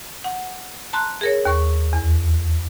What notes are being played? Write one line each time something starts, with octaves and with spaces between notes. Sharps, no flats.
F#5
A5 A#5 C6 F#6
G#4 A#4 C#5
D#2 C#6
E2